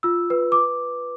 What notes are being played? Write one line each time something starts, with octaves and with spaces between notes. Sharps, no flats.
F4 E6
B4
D6